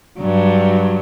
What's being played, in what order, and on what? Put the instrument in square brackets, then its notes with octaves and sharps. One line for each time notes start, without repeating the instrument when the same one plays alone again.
[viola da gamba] G2 F#3